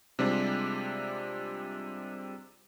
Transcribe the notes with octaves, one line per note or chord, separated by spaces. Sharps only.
C3 G3 G#3 C4 D4 F4